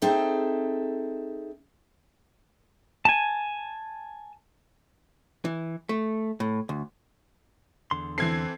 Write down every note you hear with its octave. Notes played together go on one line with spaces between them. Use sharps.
C4 D#4 G#4 A4 E5
G#5 A5
E3
A3
A2
D2
E2 D3 C6
E3 C4 A4 G#6 C7